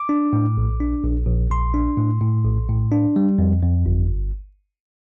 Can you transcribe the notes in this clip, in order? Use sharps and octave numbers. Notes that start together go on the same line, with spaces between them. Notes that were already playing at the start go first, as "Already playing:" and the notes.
Already playing: D6
D4
A2
A#1
D4
A#1
A#1
A#1 C6
D4
A2
A2
A#1
A2
D4
G3
F2
F2
G1